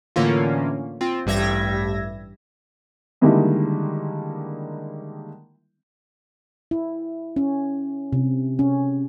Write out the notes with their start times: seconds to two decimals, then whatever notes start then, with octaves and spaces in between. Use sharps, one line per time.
0.16 A2 D3 E3 A#3 C#4 F4
1.01 C4 F4
1.26 A1 G2 G3 E5 G#6 A#6
3.21 D3 D#3 G3 G#3 A#3 E4
6.71 E4
7.36 C#4
8.13 C3
8.59 C#4